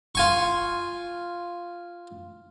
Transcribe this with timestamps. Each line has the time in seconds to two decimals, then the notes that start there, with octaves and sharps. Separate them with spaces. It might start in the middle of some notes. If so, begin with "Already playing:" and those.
0.15 F4 G#5 C#6